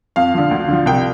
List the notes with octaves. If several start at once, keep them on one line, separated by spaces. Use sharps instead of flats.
F2 F5
D3 F3
D2
D3 F3
C2 G5